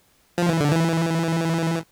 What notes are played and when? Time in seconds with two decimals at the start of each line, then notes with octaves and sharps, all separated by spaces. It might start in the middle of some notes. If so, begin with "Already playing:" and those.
0.38 F3
0.49 E3
0.60 D3
0.71 E3